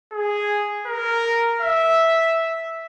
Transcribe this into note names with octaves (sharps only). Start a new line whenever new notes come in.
G#4
A#4
E5